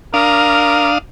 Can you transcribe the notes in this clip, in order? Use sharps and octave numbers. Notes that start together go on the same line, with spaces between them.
D4 A#4 F5 D#6